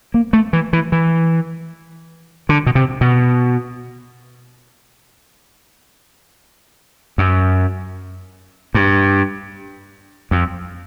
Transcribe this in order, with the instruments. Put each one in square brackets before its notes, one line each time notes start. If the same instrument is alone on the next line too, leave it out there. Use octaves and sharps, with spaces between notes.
[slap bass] A#3
A3
E3
E3
E3
D3
B2
C3
B2
F#2
G2
F2